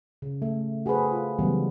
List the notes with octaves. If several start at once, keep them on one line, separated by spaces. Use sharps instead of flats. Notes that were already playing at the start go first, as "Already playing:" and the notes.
C#3
A3
F#4 G#4 A4 B4 C5
F4
C#3 E3 F#3 G3 B3